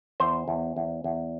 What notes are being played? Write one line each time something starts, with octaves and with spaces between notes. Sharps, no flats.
E2 C5
E2
E2
E2